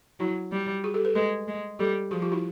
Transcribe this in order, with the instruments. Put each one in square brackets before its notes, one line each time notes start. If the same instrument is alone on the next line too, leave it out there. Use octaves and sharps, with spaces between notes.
[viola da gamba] F#3 [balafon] E4 F#4
[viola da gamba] G3
[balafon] F#4 G#4
G4 A4
A4 B4
[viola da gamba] G#3 [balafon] A4 B4
[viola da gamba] G#3
[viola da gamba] G3 [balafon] G4 A4
[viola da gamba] F3 [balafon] F#4 G#4
[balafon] F4 G4
E4 F#4